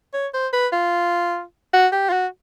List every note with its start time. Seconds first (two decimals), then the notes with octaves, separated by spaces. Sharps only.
0.13 C#5
0.34 C5
0.53 B4
0.73 F4
1.73 F#4
1.92 G4
2.09 F4
2.13 F#4